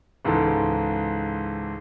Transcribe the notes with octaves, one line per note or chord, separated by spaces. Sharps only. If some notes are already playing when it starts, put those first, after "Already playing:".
C#2 G#2 E3 A4